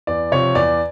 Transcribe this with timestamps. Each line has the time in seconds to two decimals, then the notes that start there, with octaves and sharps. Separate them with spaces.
0.07 E2 D5
0.32 C3 F3 C#5
0.55 E2 D5